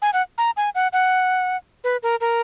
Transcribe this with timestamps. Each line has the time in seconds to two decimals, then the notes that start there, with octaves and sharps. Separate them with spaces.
0.02 G#5
0.13 F#5
0.38 A#5
0.57 G#5
0.75 F#5
0.93 F#5
1.84 B4
2.03 A#4
2.21 A#4